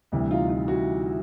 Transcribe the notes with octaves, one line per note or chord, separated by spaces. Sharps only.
D2 C3 E3 G3
D#4 F4
D#4 F4
E4 F#4